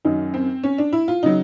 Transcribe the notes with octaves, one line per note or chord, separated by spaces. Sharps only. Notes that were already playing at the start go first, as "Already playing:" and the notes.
F#2 D#3 F#3 D#4
C4
C#4
D4
E4
F4
C#3 F#3 D#4